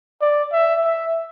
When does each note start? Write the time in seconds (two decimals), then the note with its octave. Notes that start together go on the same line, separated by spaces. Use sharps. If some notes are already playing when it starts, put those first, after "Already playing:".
0.21 D5
0.52 E5
0.84 E5